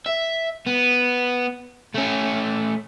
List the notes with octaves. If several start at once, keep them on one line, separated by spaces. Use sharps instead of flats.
E5
B3
A3 C#4